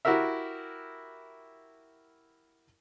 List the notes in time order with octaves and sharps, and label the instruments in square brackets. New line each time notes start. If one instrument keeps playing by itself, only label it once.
[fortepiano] E4 F#4 G4 A#4 E5